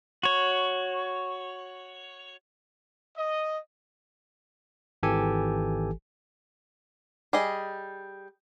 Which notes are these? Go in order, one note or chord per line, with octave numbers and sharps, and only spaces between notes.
F#4 C#5
D#5
G#1 E3 G4 A4 G#5
G3 G#4 D#5